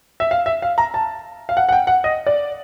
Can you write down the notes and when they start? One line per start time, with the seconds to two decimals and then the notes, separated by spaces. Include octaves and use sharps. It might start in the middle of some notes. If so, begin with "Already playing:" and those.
0.20 E5
0.31 F5
0.46 E5
0.62 F5
0.78 A#5
0.94 A5
1.49 F5
1.57 F#5
1.69 F#5
1.72 G5
1.87 F#5
2.04 D#5
2.27 D5